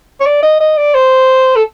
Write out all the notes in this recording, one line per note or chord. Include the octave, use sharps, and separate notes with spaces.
C#5
D5
D#5
D#5
D5
C5
A4